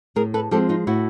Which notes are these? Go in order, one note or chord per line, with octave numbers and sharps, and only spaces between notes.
A2 G#4 A#4
A4 B4
F3 G#3 C4 G4 A4
D#4 F4
A2 E4 F#4